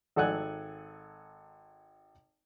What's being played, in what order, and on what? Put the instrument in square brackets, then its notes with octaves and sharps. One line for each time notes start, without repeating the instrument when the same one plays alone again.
[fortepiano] G#1 A4 D5 F#5 G#5 F#6